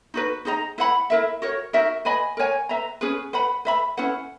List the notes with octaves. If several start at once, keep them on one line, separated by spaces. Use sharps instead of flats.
D#4 F#4 B4
D#4 G#4 D#5 A#5
E4 B4 F#5 B5
E4 A#4 E5
F#4 A#4 C#5
D#4 F#4 A#4 E5
B4 D#5 G#5 B5
A#4 C#5 G#5
B4 E5 A#5
C#4 G#4 B4
B4 F#5 B5
B4 E5 B5
C#4 E4 B4 F#5